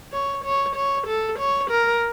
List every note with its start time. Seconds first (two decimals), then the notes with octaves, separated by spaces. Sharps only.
0.12 C#5
0.44 C#5
0.76 C#5
1.07 A4
1.39 C#5
1.71 A#4